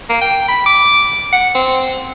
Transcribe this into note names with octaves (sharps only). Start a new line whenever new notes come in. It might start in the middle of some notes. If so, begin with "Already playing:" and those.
A#3
G5
B5
D6
F#5
C4